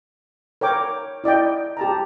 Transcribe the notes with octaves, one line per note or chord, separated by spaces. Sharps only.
A#4 C#5 G5 D6
E4 D5 D#5 G5
G4 A5 A#5